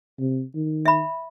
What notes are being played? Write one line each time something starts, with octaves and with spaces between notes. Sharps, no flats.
C3
D#3
E5 B5